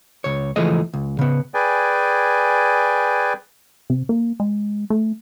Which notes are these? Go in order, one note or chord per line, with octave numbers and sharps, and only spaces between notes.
C#2 C#5
C#2 E3 F3 A3 G#4 D#5
C#2
C#3 B3
G#4 B4 D5 G5 G#5
C3
A#3
G#3
A3